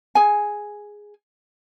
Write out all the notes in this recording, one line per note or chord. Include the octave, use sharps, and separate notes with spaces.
G#4 G#5